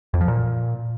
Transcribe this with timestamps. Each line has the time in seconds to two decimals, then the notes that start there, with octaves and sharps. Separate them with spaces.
0.14 F2
0.21 F3
0.28 A#2